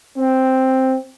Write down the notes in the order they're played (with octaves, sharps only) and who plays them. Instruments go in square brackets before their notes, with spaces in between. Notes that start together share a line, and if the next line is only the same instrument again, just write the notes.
[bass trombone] C4